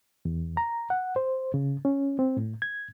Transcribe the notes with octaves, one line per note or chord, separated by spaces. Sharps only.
E2
A#5
F#5
C5
C#3
C#4
C4
A2
G#6